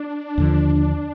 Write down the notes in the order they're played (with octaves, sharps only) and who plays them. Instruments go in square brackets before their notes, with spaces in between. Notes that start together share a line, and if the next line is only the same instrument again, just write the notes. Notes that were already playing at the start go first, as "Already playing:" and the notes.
Already playing: [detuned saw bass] D4
[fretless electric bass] D#2 D3 F3